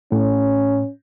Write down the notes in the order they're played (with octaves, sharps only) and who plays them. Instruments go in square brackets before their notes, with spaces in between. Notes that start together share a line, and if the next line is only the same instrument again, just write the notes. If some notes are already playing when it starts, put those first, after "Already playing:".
[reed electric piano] A2 [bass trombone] C#4